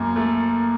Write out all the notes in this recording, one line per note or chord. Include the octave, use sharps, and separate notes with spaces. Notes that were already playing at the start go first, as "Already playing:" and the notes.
Already playing: F#2 A#3
A3